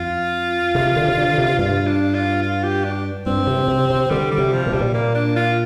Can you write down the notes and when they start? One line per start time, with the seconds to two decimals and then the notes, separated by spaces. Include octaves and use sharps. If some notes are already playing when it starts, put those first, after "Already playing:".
Already playing: F2 F4
0.75 C3
0.96 D3
1.08 C3
1.17 D3
1.38 C3
1.59 G2 F4
1.87 D4
2.14 F4
2.43 F4
2.64 G4
2.85 D4
3.26 G2 C4
3.47 C3
3.68 C3
3.90 C3
4.10 D3 G3
4.31 G3
4.38 C3
4.52 F3
4.67 A#2
4.73 C3 G3
4.81 A#2
4.94 A#3
5.15 D4
5.36 F4